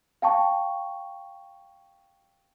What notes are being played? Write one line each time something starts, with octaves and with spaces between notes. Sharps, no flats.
F5 G5 A5 C#6